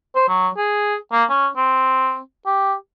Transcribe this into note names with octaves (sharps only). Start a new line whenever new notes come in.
C5
F#3
G#4
A#3
C#4
C4
G4